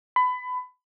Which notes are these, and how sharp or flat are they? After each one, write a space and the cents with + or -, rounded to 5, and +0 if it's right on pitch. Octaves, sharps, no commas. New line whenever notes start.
B5 +25